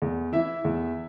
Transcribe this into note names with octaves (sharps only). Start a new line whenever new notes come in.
E2
E3 E4 E5
E2